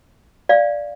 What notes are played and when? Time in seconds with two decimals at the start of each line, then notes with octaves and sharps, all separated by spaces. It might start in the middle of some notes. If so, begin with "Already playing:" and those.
0.49 D5 F5